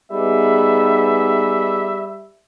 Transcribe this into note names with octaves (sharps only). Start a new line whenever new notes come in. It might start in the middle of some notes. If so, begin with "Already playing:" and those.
G3 B3 D#4 G#4 E5